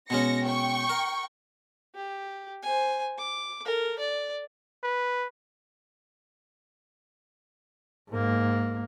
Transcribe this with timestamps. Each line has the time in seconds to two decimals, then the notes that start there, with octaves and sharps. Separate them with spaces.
0.10 B2 G#3 C#4 A#6 C#7
0.44 G5 C#6
0.89 A#4
1.95 G4
2.62 C5 G#5
3.18 D6
3.65 A4 A#4
3.99 D5
4.83 B4
8.10 G#2 A#3